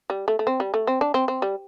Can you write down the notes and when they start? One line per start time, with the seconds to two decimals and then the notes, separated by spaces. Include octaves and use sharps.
0.10 G3
0.28 A3
0.39 A3
0.47 C4
0.60 G3
0.74 A3
0.87 C4
1.01 D4
1.14 C4
1.28 C4
1.42 G3